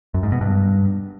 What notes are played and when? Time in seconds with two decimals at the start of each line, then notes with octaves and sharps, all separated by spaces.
0.14 F#2
0.23 G#2
0.32 B2
0.41 G2